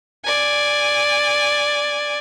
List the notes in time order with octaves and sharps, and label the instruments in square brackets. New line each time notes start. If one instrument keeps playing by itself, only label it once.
[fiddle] D5 G#5